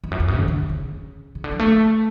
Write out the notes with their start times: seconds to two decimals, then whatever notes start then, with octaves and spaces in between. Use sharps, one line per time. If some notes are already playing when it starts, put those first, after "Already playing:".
0.04 F2
0.11 F#2
0.20 F2
0.28 F#2
0.36 D3
0.48 D3
0.69 C#3
1.35 C#3
1.44 D3
1.51 F#3
1.59 A3